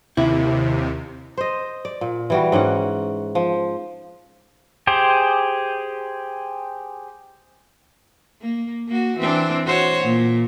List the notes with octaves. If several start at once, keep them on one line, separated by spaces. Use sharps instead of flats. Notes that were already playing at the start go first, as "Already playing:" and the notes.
D#2 C3 E4
C5 D#5
D5
A#2
E3 G3 F#4
G#2 C#4 D5 F#5
F3
G4 G#4 C5
A#3
A#3 F#4
E3 C4 D4
F#4 C5 C#5
A#2